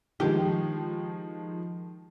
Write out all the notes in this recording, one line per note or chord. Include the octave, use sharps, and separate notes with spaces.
D#3 F3 G#3 G4